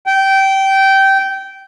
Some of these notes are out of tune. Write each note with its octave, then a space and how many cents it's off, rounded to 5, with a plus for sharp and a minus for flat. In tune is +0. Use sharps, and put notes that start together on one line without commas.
G5 -20